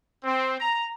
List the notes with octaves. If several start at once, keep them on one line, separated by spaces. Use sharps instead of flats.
C4
A#5